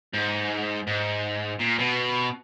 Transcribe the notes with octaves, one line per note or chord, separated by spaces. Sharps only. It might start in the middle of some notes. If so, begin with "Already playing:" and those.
G#2
G#2
A#2
B2